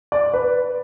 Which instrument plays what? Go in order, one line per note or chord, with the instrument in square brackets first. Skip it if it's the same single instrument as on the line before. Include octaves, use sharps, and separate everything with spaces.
[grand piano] D5
B4